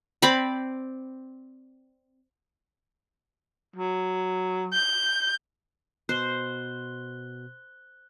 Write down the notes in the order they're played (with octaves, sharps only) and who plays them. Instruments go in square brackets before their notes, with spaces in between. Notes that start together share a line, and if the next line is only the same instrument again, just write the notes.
[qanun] C4 D5 B5
[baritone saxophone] F#3
[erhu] G6
[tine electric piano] B2 [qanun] C5 [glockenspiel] F#6 G7